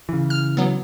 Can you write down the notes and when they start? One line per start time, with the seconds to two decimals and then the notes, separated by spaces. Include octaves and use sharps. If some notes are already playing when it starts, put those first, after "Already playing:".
0.09 C#3 E3
0.30 F6
0.57 F#3 B3